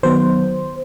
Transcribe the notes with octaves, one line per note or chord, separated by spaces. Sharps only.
D#3 F#3 B3 C5